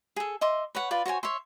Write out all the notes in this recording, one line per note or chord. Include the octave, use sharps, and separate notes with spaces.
G#4 A4
D#5 E5 C6 D6
B4 C#5 F#5
F4 B4 D5
F#4 C5 C#5 G#5
C#5 E5 C6